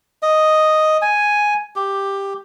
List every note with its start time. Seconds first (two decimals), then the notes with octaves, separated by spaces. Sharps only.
0.23 D#5
1.02 G#5
1.76 G4